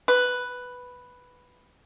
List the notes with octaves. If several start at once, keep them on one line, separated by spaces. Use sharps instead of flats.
B4